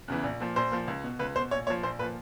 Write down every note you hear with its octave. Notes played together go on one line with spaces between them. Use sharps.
E2 C#3 E3
A#1
A#2 F3
A#1 C5
A#2 F3
C#2
B2
C#2 B4
B2 C5
A#1 C#5
A#2 F3 C#5
A#1 C5
A#2 F3 B4